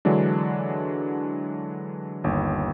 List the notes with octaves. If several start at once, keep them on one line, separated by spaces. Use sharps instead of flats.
D3 E3 F#3 G#3 D4
G1 D#2